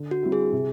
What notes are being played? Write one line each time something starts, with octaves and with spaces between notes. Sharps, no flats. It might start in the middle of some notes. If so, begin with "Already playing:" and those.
Already playing: D3
F#4
G3 C4 E4 G4
G#4
C3